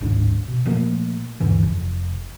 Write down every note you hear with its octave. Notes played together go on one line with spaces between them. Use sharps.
D1 G#1 G#2 D4
B2
A#2 F3 A3 A#3
D2 G2 E3
F1